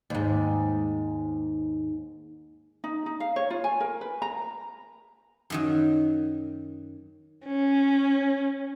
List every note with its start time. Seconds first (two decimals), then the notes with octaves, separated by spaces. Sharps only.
0.10 D#2 G#2
2.84 D#4
3.06 D#4
3.20 F5
3.36 C#5
3.50 F4
3.64 G#5
3.80 A#4
4.01 B4
4.22 A#5
5.50 F#2 D#3 F#3
7.46 C#4